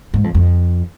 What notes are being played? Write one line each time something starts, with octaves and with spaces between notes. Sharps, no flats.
G#2
F2
F2